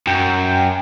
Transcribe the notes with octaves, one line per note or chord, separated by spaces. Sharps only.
F#2 G5